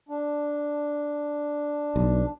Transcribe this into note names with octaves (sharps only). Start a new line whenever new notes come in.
D4
B1